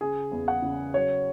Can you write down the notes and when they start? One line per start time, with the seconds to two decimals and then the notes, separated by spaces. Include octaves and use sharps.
0.01 C#3 G#4
0.31 E2
0.48 F#5
0.62 C#3
0.94 F#3 C#5